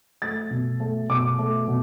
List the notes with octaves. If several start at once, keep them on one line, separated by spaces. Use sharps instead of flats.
A3 A6
B2
A3
B2 D6
A3
B2